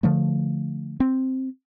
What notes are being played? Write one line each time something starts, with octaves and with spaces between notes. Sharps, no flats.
D3 F3 A3
C4